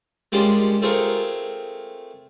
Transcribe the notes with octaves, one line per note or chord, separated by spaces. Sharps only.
G3 G#3 A#3 C#4 D4 F4
A3 C4 F4 G#4 A#4